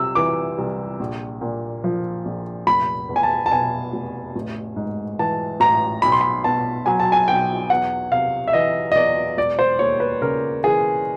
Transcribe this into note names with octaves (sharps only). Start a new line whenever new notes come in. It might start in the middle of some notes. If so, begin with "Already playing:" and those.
Already playing: C2 C3 E6
E3 D6
C2
A#1
A#2
F3
A#1
F1 B5
E2
G#5
A5
A5
B2 G#5
F1
A1
G#2
E3 A5
A1 A#5
B1 B5
C6
B5
B2 A5
F#3 G#5
A5
G#5
B1 G5
E2 F#5
C3 F5
E5
E3 D#5
D#5
E2 D5
E1 D5
C5
D#2 C#5
B4
C#3 A#4
E3 G#4